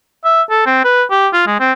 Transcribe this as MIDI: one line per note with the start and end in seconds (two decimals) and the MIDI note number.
0.24 0.42 76
0.50 0.62 69
0.66 0.84 60
0.84 1.03 71
1.10 1.28 67
1.33 1.44 65
1.47 1.57 56
1.60 1.72 60